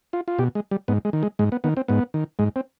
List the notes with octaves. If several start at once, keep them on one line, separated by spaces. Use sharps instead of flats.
F4
F4
B2 G4
G#3
G3
G#2 B3
G#3
D#3
G#3
G#2 G#3
B3
D#3 B3
C4
G#2 B3
D#3
G#2 G#3
C4